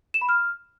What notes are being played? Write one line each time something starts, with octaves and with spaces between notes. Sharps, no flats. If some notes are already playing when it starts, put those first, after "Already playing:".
E7
B5
F6